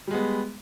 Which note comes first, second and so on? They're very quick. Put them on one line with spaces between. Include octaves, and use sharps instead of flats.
G3 G#3 B3